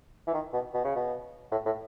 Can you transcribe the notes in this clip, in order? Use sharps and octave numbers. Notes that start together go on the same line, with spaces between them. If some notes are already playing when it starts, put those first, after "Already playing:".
E3
D#3
B2
B2
C#3
B2
A2
A2